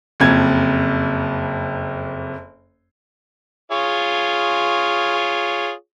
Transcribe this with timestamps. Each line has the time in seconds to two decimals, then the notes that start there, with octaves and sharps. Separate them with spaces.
0.20 F#1 F2 G#6
3.72 F4 G#4 C#5